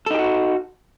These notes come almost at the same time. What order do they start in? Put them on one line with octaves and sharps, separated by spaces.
A4 D#4 G4 F#4